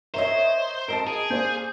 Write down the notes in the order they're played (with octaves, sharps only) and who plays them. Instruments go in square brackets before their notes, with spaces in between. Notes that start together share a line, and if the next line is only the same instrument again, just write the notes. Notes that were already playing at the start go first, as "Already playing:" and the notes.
[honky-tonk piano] A#4 C#5 D#5 [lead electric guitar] C5 [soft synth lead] E5
[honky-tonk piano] A#4 D#5 A5 [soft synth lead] D7
[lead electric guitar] G#4
[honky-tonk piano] A#3 C5 D5 [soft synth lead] G6